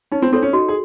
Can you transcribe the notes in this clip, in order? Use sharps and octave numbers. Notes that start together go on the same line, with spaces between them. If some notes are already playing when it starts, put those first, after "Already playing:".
C#4 D#4
C4
C4 A4 C#5
C#4
D#4 F#4
G#4